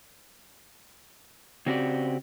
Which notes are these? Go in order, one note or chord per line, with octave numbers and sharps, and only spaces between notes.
C#3 C4 F#4 G4 D5